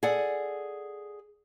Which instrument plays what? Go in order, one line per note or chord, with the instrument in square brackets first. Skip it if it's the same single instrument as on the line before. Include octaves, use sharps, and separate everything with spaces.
[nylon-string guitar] G#4 A4 D5 F#5